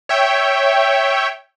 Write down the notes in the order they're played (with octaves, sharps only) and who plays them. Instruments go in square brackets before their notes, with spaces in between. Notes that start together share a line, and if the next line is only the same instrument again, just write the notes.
[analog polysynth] C#5 E5 G5